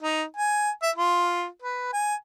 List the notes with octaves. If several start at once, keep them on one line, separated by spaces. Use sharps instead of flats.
D#4
G#5
E5
F4
B4
G#5